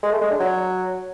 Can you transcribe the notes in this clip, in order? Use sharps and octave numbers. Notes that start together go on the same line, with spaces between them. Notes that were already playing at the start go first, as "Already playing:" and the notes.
G#3
A3
G#3
D4
F#3